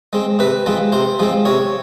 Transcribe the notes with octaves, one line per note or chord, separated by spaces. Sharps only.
G#3 C4
C3 B4
F3 G#3 C4
C3 C5
F3 G#3 C4
C3 C#5